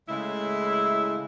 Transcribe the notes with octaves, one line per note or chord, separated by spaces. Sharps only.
A2 C#3 G#3 E4